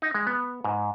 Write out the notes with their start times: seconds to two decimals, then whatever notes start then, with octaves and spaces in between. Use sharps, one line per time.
0.02 D#4
0.14 G#3
0.27 B3
0.64 G#2